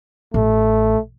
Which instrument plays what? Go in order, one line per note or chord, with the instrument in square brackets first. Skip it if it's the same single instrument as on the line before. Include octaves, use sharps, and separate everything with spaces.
[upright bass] A1 [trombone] A3